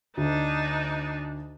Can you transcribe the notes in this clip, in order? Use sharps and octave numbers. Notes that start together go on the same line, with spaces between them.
D2 D4 D#4